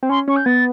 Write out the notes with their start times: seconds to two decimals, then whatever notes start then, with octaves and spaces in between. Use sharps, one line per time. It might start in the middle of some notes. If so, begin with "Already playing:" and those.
0.03 C4
0.10 C#4 C6
0.28 C#4 C#6
0.36 G6
0.45 B3 A6